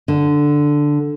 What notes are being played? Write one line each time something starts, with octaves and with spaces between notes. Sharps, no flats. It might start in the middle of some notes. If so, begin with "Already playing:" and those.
D3